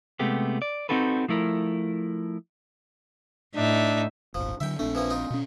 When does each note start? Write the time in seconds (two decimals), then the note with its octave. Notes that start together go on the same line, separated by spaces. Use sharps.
0.19 C3 G#3 A3 B3 G4
0.62 D5
0.89 C4 D#4 F#4 A4 B4
1.28 F3 A3 E4 A#4
3.55 A2 D4 D#4 E5
4.35 D#1 G#1 F3
4.60 D3 F3 F#3 E5 G5
4.79 A#1 A3 C4 D4
4.95 E3 F3 A#3
5.10 D#4 F4
5.30 B2 C#4